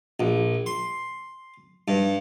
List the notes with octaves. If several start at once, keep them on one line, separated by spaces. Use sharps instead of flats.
A#1
C6
G2